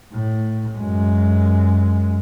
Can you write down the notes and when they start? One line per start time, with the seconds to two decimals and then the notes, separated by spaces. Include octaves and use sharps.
0.13 A2
0.77 F#2 G#3